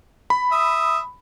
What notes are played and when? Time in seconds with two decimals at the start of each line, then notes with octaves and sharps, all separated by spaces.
0.30 B5
0.52 E5 D#6